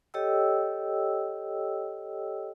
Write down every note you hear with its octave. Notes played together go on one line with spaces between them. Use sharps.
G4 A4 C#5 D#5 G5 E6